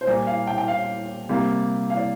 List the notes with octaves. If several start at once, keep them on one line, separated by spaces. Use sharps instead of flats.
C5
A#2 G3 A#3 D5
F5
G5
G5
F5
C3 G3 A#3
F5
D5